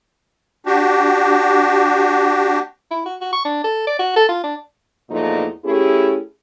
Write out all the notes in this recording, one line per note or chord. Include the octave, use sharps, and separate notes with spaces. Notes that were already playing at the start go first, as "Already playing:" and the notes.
D4 F#4 G4
E4
F#4
F#4
C#6
D4
A4
D5
F#4
A4
F4
D4
E2 A#2 F3 A3 D#4
A3 C#4 E4 G4 G#4